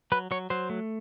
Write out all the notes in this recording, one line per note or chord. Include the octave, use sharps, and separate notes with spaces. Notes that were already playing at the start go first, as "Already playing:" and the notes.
F#3 B4
F#3 C#5
F#3 C5
A3